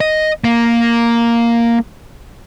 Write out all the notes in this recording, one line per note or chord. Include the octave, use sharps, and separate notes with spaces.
D#5
A#3